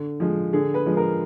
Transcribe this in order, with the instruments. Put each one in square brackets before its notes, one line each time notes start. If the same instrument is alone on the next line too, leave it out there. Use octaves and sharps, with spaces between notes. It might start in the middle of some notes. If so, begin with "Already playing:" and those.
Already playing: [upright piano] D3
F3 G#3
D3 G#4
B4
F3 G#3
A#4